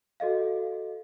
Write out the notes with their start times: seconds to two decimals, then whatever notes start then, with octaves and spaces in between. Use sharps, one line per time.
0.20 F#4 A4 D#5 F5